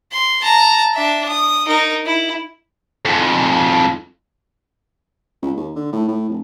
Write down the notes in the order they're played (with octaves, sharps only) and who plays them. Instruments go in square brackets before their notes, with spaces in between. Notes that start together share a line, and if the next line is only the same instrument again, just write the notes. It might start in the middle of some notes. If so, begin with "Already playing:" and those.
[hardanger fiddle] C6
A5 A#5
D4 E5
D#6
D#4 A#4
E4
[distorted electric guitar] F2 G#2
[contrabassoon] C#2
D#2
D3
A2
A2
F1